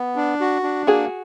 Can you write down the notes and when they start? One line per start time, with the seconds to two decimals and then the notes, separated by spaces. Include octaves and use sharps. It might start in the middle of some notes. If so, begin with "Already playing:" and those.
Already playing: B3
0.16 D4
0.41 F#4
0.63 D4
0.87 A#3 F#4 G#4